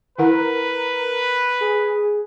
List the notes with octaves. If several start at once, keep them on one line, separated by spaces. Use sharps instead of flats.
D#3 E4 A#4 B4 F#5
G#4